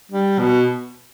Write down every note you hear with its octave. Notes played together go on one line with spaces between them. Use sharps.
G3
B2